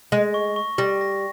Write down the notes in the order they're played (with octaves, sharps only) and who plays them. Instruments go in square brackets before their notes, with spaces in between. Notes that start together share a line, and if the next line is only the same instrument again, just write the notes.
[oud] G#3 [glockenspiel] A#6
[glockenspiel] C#6
C#6
[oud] G3 [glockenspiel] A#6
[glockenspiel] A#6